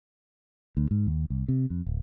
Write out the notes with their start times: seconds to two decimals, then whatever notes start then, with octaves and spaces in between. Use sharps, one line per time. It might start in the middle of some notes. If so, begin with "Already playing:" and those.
0.77 D2
0.91 G#2
1.07 D#2
1.30 C2
1.48 C3
1.70 F2
1.86 D1